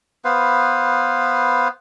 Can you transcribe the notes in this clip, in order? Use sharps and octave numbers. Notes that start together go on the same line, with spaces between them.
B3 B4 C5 F5